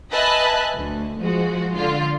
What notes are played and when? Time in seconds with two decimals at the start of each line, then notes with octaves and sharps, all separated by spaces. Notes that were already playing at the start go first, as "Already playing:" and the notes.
0.11 B4 D#5 E5 G#5 A5 F#6
0.76 D2
1.19 F3 G#3 F#4
1.76 D3 F4